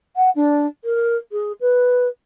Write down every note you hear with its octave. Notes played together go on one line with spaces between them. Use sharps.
F#5
D4
A#4
G#4
B4